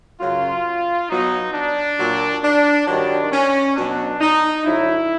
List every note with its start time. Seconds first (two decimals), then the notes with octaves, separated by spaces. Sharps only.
0.21 F#2 C#3 F#3 F4
1.10 B2 F#3 D#4
1.54 D4
1.99 A#2 F#3
2.44 D4
2.88 G2 D#3 F#3 D4
3.32 C#4
3.76 B2 F#3 D4
4.21 D#4
4.65 F#2 D3 F#3 E4